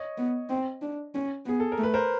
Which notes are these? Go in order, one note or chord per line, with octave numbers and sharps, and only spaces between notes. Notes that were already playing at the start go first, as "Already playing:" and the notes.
Already playing: C#5 D#5
B3
C4
D4
C#4
B3 G#4
A4
A#4
A3
B4
A#4 C5